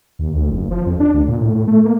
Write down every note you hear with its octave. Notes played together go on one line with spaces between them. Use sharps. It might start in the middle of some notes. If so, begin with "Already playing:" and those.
D#2
D2
F#1
F3
F2
D4
D2
A#2
A2
A2
A3
A#3